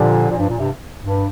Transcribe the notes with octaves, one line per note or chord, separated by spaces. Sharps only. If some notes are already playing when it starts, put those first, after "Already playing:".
Already playing: A#2 D3 F3 D4 G4 C5
A#2
G2
A#2
G2 C3
G2